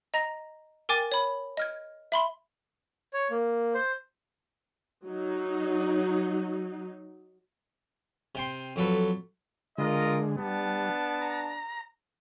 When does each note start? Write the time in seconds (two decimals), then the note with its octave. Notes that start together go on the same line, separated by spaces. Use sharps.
0.14 D#5 A#5 A#6
0.89 A#4 G5 G#5 D6 A6
1.12 C#5 B5
1.57 D#5 F6 G#6
2.12 E5 B5 C6
3.13 C#5
3.31 A#3
3.74 C5
5.06 F#3 D#4
8.35 C3 G5 C6
8.76 F2 F#3 A4 B4
9.78 D3 G#3 F4 A#4 D#5
10.38 G3 B3 D4 A5
11.21 A#5